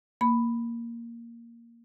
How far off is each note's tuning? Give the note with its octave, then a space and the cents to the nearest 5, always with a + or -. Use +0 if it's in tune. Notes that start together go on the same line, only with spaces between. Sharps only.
A#3 +0 B5 +5